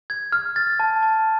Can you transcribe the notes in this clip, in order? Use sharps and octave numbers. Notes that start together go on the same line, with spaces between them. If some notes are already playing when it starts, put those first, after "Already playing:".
G#6
F6
A6
A5
A5